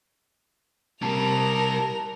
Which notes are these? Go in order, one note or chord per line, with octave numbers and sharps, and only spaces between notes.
C3 G3 A#4 A5 F7